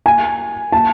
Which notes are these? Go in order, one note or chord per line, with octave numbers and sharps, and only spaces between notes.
G#5
A5